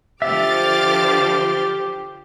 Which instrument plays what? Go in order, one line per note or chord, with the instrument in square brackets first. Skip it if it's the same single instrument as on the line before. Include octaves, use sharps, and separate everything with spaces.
[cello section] D3 F3 C5 [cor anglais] G4 [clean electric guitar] E5 [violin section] D6 F6 A6